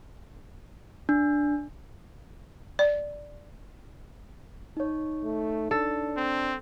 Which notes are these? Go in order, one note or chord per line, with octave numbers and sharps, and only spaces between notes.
D4
D5
D#4 C#5
A3
D4 A4
C4